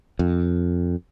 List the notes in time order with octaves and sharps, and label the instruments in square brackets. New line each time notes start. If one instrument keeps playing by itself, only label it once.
[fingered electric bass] F2